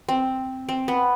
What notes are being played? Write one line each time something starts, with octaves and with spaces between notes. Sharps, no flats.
C4
C4
B3